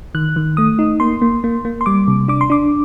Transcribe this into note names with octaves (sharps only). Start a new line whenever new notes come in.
D#3 F#6
D#3
A3 D#6
D#4
A#3 C6
A#3
A#3
A#3
C6
G3 D6
C3
D4 D6
C6
D4 D6